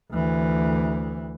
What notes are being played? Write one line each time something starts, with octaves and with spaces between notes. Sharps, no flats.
D2 E3